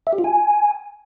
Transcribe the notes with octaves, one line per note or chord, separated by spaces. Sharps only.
E5
G4
F4
G#5